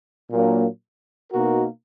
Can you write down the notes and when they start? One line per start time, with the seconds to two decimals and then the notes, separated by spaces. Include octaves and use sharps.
0.30 A#2 F#3 A#3 D4
1.32 B2 A#3 D#4 F#4 A#4